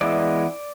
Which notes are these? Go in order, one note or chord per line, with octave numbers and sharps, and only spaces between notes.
E3 G#3 B3 E4 D5